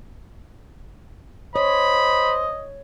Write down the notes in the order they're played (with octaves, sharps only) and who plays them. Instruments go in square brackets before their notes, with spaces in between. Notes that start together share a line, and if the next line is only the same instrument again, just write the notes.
[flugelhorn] C5 [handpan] C#5 [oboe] D#5 [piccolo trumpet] B5